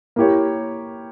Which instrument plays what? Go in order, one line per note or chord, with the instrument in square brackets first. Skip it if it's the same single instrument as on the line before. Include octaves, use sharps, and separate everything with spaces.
[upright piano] A#3 E4 G4 C#5